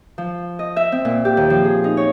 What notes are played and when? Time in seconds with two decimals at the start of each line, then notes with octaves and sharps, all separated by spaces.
0.18 F3
0.59 D#5
0.76 E5
0.92 C4
1.05 A#2
1.25 G4
1.37 D#2
1.50 F3
1.64 G#4
1.84 D#4
1.97 C#5